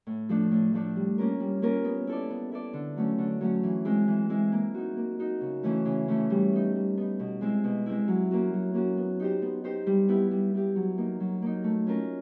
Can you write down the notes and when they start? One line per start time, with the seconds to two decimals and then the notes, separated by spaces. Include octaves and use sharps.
0.07 A2
0.29 F3 A3 D4
0.51 A2
0.73 F3 A3 D4
0.96 G3
1.18 A#3 C#4 F4 A#4
1.40 G3
1.62 A#3 C#4 F4 A#4
1.84 B3
2.07 E4 A4 D5
2.30 B3
2.52 E4 A4 D5
2.73 D3
2.96 F#3 A3 C#4
3.18 D3
3.41 F#3 A3 C#4
3.63 E3
3.85 G#3 C4 E4
4.08 E3
4.29 G#3 C4 E4
4.52 A#3
4.74 D#4 F#4
4.97 A#3
5.19 D#4 F#4
5.41 C#3
5.63 E3 A3 C#4
5.85 C#3
6.08 E3 A3 C#4
6.30 G3
6.52 B3 D#4
6.75 G3
6.97 B3 D#4
7.19 B2
7.41 G#3 C4 E4
7.64 B2
7.86 G#3 C4 E4
8.08 F#3
8.31 A#3 C#4 F#4
8.53 F#3
8.74 A#3 C#4 F#4
8.97 B3
9.20 D#4 G4 C5
9.42 B3
9.64 D#4 G4 C5
9.86 G3
10.08 B3 E4 G4
10.31 G3
10.54 B3 E4 G4
10.76 F#3
10.98 A#3 D#4
11.20 F#3
11.42 A#3 D#4
11.64 A3
11.87 C#4 F4 A#4